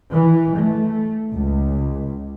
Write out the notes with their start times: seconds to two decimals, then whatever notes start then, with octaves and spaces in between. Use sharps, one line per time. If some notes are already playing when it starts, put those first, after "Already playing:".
0.12 E3
0.57 A3
1.34 C#2